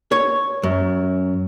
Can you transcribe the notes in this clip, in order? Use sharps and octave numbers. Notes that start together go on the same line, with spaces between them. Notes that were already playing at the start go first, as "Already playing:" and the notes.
C#5
F#2